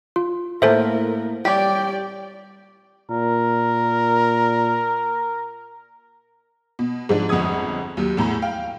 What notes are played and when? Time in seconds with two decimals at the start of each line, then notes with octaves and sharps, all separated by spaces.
0.16 F4
0.62 A2 A#3 B3 A4 A#4 C5 E5 A5
1.45 G3 G4 C#5 D5 G5
3.11 A#2 A#4
6.79 B2
7.09 G#2 F3 D4
7.29 G1 F2 G#3 F#5 D#6 G#6
7.97 D#2 F#3 G4
8.17 E2 A2 A#5 B5
8.42 F5 G5